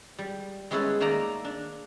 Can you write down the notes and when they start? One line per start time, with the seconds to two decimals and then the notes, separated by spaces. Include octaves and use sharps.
0.19 G3
0.71 G#3 B3 C#4 E4 A4 B4
1.00 D#3 A3 A#3 A4 D5 A#5
1.45 D4